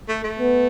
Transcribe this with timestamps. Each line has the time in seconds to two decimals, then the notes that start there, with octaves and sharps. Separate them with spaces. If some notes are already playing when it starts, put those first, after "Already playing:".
0.09 A3
0.24 A3
0.39 B3